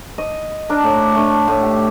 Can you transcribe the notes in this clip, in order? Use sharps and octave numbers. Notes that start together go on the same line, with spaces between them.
D#5
D4 A#4
A2
A3 D4
A2
G4